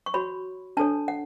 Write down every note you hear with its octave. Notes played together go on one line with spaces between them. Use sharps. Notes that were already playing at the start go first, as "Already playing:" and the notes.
C#6
F#4 C#5 B5
D4 A4 C#5 A5
F#5